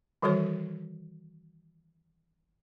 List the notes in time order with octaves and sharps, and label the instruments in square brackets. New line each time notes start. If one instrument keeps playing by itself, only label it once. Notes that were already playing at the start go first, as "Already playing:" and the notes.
[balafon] D#3 E3 G3 F#4 A4 C#5